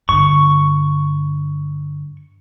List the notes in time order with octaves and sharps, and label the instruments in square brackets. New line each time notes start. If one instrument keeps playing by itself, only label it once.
[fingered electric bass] G2 D3 [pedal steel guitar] C#6